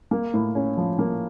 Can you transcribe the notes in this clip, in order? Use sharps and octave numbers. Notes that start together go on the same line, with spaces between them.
A#3
A2
C#4
F3
A#3